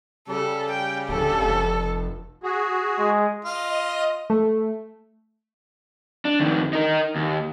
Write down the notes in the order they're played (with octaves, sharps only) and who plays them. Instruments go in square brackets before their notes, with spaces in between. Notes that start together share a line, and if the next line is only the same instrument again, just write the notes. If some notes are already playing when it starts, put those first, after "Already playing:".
[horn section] C#3 G3 [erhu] A4
[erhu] G5
[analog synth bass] D1 [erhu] A4
[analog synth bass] F1
[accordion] F#4 G#4
[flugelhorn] G#3
[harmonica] F4 [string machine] D#5
[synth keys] A3
[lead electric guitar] D4
F2 D#3
D#4 A#4
D#2